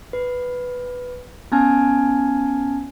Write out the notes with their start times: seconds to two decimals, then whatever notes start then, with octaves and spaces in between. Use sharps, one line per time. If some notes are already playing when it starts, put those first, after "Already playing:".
0.13 B4
1.52 B3 C#4 G#5 A5 F6 G#6